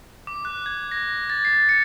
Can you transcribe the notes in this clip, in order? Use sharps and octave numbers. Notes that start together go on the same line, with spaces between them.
D6
F#6
G#6
A#6
A6
C7
C#7